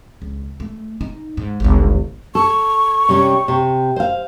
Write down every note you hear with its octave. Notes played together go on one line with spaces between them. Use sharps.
C#2
A3
D#4
G#2
G1 C#2
A4 C#6
C3 G3 C#4
C3
C5 F5